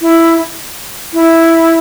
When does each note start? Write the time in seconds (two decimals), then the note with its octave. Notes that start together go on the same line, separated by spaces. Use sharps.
0.02 E4
1.14 E4